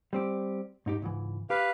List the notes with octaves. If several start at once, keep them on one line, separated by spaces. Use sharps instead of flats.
G3 C4 G4
G#2 D#4 G4
C#2 G#2 E3
G4 B4 F5